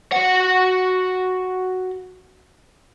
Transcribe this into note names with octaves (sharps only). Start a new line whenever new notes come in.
F#4 F#5